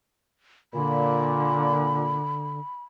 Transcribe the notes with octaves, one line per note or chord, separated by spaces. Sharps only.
A#2 D3 B5